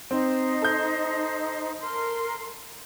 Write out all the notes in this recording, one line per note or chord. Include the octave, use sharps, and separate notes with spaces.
C4 D#4 C5
A4 G6
A#4 C6